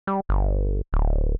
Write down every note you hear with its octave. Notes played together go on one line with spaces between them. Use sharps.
G3
G1
D1